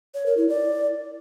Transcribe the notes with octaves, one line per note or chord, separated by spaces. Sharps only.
C#5
A#4
E4
D5